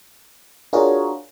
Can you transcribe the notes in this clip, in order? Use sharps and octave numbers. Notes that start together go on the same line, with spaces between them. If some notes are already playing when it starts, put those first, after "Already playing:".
D4 F4 F#4 G#4 A#4 C#5